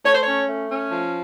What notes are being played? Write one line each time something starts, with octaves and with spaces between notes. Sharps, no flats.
A3 C#5
C5
C#5
C#4
A3
C#4
F3